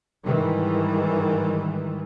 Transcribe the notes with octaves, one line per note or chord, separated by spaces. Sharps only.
G#2 D#3 E3 G3